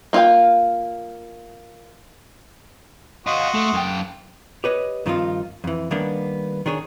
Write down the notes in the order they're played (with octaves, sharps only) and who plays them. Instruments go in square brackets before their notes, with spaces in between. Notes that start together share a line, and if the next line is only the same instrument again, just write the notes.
[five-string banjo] A#3 F4 D5 F5 G5
[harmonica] F#4 C6 D#6 [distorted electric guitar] D#5 F5
[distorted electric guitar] A3
F#2 G5
[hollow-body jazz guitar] G4 B4 C#5 D#5
G2 D#3 F3 C4 D#4 F4
F2 E3
D#3 G3 A#3 B3 D4
D#3 D4 G#4 C#5